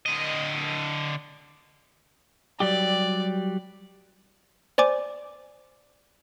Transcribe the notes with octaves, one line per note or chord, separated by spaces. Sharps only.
D3 D#5
F#3 G3 G4 D5
C5 D5 G#5 D6